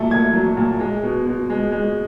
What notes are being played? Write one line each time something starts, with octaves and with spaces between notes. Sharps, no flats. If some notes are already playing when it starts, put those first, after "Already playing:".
Already playing: A#2 F#3 A3
A#2 G#6
F#3
A#2
G#3
B2
B2
G#3
G#3